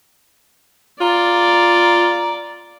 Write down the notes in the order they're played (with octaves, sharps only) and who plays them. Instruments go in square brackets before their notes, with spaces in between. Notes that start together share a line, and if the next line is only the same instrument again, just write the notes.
[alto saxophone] F4 [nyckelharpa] D5 [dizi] A#5